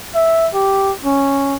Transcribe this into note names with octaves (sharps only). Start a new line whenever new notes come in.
E5
G4
C#4